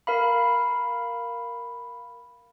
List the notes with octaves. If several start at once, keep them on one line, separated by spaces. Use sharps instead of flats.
A#4 F5 B5